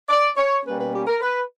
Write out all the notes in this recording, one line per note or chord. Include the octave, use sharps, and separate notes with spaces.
D5
C#5
B2 G3 A#3 C#4 B4
B4
G4
A#4
B4